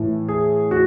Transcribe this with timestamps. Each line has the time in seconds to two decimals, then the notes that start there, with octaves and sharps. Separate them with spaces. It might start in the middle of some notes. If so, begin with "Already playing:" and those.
Already playing: A2 E3
0.29 G#4
0.71 F#4